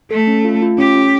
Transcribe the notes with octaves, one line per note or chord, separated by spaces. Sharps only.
A3 A4
C#4
F4
F4
C#4 G4
C#4